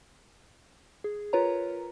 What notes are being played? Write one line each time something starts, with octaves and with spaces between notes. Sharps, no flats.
G#4
F4 A#4 B4 C#5 A#5